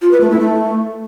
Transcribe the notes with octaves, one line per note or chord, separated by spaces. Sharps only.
F4
B4
A3
E4
A3